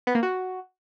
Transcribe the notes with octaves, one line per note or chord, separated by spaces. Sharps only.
B3
A#3
F#4